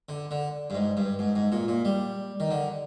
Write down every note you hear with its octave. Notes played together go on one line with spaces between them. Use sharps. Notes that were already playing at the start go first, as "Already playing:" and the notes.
D3
D3
G2
G#2
G2
G#2
G#2
A#2
A#2
G3
D#3
D3